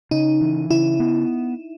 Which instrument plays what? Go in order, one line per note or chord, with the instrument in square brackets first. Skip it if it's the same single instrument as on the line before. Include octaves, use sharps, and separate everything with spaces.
[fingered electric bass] C#3 [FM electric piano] D#4
[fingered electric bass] E3
[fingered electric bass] C#3 [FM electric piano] E4
[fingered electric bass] B3